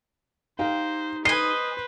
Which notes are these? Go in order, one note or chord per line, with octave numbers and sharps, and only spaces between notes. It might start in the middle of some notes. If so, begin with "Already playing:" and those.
D#4 G4 C5 F5 G5
B4 C5 D#5 G#5 C7